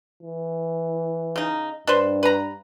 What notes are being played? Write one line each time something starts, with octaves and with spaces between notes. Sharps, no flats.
E3
C#3 D#4
G2 D4 B4 C5
B4 A#5